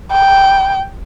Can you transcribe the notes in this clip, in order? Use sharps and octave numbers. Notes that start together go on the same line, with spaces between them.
G5